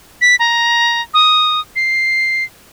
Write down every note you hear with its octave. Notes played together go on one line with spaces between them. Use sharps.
B6
A#5
D#6
C7